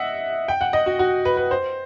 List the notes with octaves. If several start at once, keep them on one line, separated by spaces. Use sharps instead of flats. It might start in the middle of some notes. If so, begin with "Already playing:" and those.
Already playing: D#5 E5 F#5
G5
F#5
D#5
F#4
F#4
B4
B4
C5